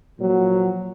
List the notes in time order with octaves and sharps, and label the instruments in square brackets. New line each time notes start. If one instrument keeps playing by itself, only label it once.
[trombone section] A#2 F3 F#3